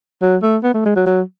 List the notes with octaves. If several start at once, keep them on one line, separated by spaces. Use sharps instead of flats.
F#3
A3
B3
A3
G#3
F#3
F#3